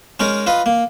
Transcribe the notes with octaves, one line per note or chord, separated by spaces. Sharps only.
G#3 C#4 D#4 A#4
F4 B4 D#5
A#3